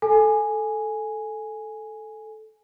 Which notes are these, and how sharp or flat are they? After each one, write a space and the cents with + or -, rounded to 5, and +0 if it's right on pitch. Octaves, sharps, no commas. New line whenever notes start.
A4 -5 G#5 +0